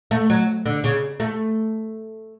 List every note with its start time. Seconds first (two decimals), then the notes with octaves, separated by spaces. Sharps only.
0.11 A3
0.30 F#3
0.66 D3
0.84 C#3
1.20 A3